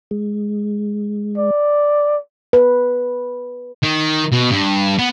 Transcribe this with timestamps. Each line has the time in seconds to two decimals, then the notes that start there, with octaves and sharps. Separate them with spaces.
0.11 G#3
1.37 D5
2.53 B4
3.84 D#3
4.32 B2
4.51 G2
4.99 B3